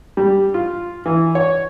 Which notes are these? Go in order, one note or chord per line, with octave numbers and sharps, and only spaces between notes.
G3
F4
E3
C#5